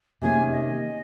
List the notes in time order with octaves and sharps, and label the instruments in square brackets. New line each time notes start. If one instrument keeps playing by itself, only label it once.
[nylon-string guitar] C3 D#3 A#3 C#4 G#4 [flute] G#5
[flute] D#5